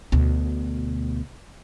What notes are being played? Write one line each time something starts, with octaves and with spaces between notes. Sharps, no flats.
D2 B2